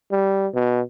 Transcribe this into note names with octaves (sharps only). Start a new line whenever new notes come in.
G3
B2